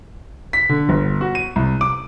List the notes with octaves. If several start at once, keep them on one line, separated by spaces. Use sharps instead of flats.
B6
D3
G1
F#4
D#7
C2
D6